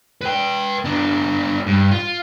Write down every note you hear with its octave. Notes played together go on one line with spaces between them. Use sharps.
B4 G5
B3 D4
G2
F4